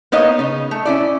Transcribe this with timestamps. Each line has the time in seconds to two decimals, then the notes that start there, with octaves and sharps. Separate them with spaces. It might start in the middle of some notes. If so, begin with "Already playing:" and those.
0.12 A#3 B3 D#4 C#5 D#5
0.39 C#3 D#4
0.71 A3
0.85 C#4 E4 D5